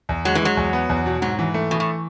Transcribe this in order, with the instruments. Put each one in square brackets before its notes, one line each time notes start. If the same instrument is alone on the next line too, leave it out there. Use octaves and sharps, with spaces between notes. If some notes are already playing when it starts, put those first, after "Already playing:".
[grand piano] E2
[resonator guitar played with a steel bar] F#3 [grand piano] G#3
[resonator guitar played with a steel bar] E3
[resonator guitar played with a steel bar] F#3 [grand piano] G#3
[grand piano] E2
B3
E2
B2
[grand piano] G#2 [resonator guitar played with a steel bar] F#3
[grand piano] E3
A3
[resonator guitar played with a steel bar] B2 [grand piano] E3
[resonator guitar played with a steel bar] A2